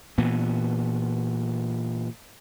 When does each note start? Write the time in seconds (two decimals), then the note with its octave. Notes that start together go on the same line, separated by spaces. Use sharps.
0.18 A#2 E3 B3